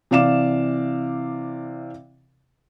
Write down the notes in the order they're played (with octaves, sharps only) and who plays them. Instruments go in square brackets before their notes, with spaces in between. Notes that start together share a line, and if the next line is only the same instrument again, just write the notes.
[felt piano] C3 E3 D5 F5 D6 E7